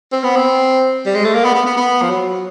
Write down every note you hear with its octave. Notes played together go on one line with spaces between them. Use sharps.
C4
B3
C4
G3
G#3
A3
A#3
B3
B3
B3
B3
F3
F#3